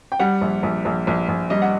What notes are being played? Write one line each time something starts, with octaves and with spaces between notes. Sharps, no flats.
G5
G3 F#5
A#1
A#1
A#1
A#1
A#1
G3 D#5
F#5